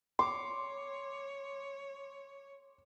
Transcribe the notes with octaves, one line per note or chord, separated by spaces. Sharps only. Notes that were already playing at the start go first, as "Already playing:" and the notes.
C#5 C6 D6